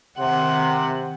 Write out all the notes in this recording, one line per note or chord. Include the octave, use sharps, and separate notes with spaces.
C3 D#3 C4 F#5 C6